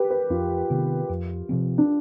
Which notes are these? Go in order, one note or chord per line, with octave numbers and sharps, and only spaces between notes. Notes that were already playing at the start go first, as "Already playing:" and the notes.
Already playing: G4 B4
B4
F2 F4
C3 D#3 B3
F2
C3 F3 C4
D4